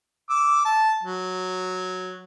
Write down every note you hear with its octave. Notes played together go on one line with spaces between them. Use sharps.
D6 E6
A5
F#3